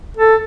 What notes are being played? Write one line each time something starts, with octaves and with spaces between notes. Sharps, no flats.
A4